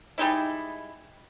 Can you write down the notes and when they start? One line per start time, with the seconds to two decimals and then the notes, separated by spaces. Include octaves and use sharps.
0.18 G3 G#3 D#4 E4